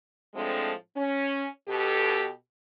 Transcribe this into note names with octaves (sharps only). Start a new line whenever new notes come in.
A2 F3 G#3 A3 C4 D4
C#4
B2 G4 A4